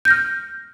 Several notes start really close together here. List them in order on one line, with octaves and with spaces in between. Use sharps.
G6 A#6 F6